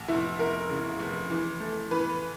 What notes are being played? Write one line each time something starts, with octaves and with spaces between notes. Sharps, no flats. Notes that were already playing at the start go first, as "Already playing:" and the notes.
Already playing: A1
F1 E4
F1 A#4
C#3
F1
E3
A3
E3 B4